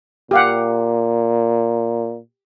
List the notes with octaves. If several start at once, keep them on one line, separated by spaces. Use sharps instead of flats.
A#2 G4 F5 F#5